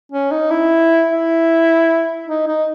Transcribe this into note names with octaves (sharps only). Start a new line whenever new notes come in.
C#4
D#4
E4
E4
D#4
D#4